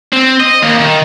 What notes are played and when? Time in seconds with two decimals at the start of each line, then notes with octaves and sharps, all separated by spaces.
0.13 C4
0.40 D#5
0.62 D#2
0.79 D#3